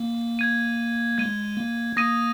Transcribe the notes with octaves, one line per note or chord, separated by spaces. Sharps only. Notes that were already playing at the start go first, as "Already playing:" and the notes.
Already playing: A#3
G#6 D#7
G#3 G#6 D#7
A#3
A#3 D#6 A#6 D#7